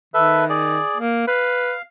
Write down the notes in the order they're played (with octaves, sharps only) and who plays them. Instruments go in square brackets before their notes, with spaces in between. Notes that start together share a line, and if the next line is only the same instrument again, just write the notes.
[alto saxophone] D#3 [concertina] A4 B4 E5
[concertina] G#4 D5
[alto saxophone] A#3
[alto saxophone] B4 [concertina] F5